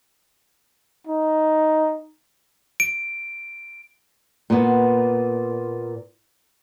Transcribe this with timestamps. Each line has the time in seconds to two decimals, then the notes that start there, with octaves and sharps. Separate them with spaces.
1.07 D#4
2.80 D7
4.50 A#2 B3